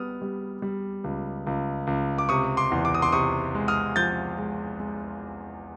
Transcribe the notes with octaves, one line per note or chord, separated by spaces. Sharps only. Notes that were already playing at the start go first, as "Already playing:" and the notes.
Already playing: G3 B3 D#6 F6
G3
G3
C#2
C#2
C#2
D6
C3 C#6 D#6
C6 D6
E2
D6
D#6
C6 D6
C3 C#6 D#6
G#3
D#6 F6
F3 G6 A6
G#3
G#3